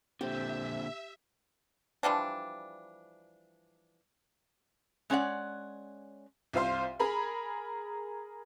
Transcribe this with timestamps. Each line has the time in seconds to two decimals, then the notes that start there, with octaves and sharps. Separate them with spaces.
0.21 A#2 D3 C4 G4 C5 E5
2.03 E3 F3 G3 D4
5.10 G#3 C#4 C#5 D5 F#5
6.53 C2 F4 C5 F5 C6
7.00 G#4 A#4 B5